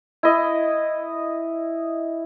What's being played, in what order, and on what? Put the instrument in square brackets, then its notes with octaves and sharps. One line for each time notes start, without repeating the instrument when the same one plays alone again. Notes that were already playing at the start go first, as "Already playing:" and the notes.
[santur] E4 D#5